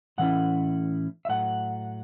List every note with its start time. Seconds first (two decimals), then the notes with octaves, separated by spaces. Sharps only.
0.18 A2 E3 A3 C#4 E4 F#5
1.25 E5
1.29 A2 F#3 A3 F#5